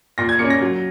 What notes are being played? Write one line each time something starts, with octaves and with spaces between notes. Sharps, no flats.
A#2 A#6
G#6
A#3 C#4 C#7
A#6
F#3